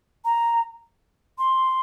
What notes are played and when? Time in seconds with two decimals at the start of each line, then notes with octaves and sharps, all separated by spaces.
0.25 A#5
1.38 C6